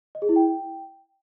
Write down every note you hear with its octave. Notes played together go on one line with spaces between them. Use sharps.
D#5
G#4
E4
G5